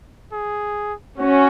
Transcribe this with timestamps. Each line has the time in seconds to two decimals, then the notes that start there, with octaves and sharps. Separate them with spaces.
0.32 G#4
1.19 C#4 F#4